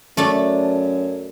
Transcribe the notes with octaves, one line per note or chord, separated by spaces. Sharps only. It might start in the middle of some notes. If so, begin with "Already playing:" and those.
F#2 A3 D4 A4